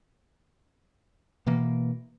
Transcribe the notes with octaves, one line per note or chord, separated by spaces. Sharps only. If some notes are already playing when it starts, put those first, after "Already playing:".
B2 E3 A#3